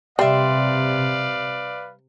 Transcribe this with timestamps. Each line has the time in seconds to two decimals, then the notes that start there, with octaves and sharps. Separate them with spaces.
0.19 C3 G3 B4 D5 E5 F5 C6